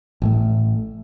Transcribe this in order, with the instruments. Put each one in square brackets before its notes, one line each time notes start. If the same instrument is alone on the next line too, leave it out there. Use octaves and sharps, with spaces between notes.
[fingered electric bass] A1 A2 A3